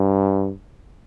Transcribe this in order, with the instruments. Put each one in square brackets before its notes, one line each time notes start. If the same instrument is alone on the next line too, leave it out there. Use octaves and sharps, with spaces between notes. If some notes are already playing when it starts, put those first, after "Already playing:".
Already playing: [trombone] G2